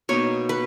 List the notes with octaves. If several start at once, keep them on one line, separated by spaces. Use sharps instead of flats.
B2 A#3 D#4 C#5
B4